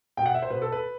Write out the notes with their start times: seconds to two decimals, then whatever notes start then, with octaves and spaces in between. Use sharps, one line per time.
0.17 B2 G5
0.26 F#5
0.34 E5
0.42 C5
0.50 B2 B4
0.62 A4
0.72 B4